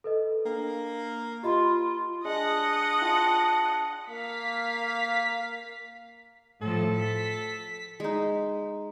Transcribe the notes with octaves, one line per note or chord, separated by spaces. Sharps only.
A4 B4 D#5
A#3 D4
F4 G4 D#5 B5
G#3 D4 D#5 F#5
F4 G5 A5
A#3 F5 B6
A2 F3 A4
B6
G#3 D#4